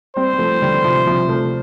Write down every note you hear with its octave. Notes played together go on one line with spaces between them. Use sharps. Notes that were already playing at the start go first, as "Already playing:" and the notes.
G3 C4 C5
C4
F3 A3
D3 G3
C3 F3
C3 F3
F3 A3